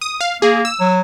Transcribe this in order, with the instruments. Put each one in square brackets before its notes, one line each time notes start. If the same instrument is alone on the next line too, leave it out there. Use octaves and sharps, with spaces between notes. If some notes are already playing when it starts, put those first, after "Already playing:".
[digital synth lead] D#6
F5
[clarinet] A#3 [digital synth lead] G#4
[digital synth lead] E6
[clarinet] F#3